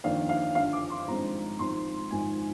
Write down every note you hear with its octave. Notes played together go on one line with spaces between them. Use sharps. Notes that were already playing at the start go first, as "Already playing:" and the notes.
G1 F2 D#3 A#3 D4 F5
F5
G1 G2 D3 F3 F5
D6
C6
G#1 G2 F3 G#3 C4 A#5
G#1 G#2 F3 C4 C6
G#1 G#2 F3 G#5